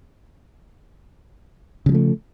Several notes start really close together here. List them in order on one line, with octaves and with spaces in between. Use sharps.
C#3 G3 F3 A3